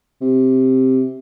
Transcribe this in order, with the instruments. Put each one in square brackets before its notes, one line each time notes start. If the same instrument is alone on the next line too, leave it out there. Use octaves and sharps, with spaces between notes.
[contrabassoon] C3